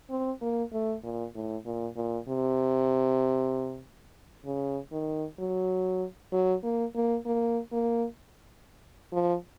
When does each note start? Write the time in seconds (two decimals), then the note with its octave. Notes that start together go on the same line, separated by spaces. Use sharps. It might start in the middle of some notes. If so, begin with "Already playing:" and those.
0.10 C4
0.42 A#3
0.73 A3
1.04 A#2
1.35 A2
1.66 A#2
1.97 A#2
2.28 C3
4.45 C#3
4.92 D#3
5.39 F#3
6.33 F#3
6.63 A#3
6.95 A#3
7.26 A#3
7.73 A#3
9.13 F3